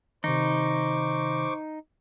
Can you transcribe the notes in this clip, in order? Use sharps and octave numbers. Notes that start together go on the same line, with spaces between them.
C3 D#3 D#4 C5 C#6 D6